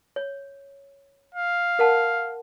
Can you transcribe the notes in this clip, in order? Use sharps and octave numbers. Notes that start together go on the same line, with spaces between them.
C#5
F5
A#4 F#5 A5